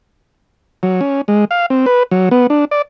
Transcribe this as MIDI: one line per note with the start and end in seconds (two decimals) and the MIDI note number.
0.83 1.01 54
1.01 1.21 61
1.28 1.45 56
1.51 1.66 77
1.70 1.86 60
1.86 2.03 71
2.11 2.29 54
2.31 2.47 59
2.50 2.65 62
2.71 2.82 74